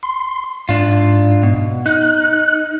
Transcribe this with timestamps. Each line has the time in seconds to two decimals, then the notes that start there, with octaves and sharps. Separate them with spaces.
0.03 C6
0.69 G#2 D4 F4
1.43 B2
1.86 D#4 F#6